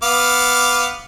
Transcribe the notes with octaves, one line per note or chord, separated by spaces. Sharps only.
B3 F5 D6